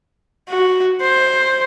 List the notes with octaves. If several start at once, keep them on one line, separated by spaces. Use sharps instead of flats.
F#4
C5